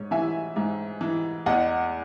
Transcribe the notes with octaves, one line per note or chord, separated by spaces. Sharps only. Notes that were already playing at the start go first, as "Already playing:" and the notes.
Already playing: G#2 C#5
E3 E5 G#5
G#2
E3
E2 D#5 F#5